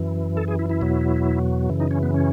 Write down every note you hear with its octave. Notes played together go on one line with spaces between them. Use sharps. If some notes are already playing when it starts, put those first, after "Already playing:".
Already playing: F#2 E3
A4
G#4
E4
E4
E2 B2 F#3
F#2 C#3 E3
D#4
C#4
B3
C#4